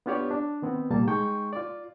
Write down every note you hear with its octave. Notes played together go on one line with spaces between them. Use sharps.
B3 D4 F4 G4 C#5 D5
D4
D#3 B3 C4
C2 A#2 G3 A#3 A5
G#3 D#4 G5 C#6
F4 D5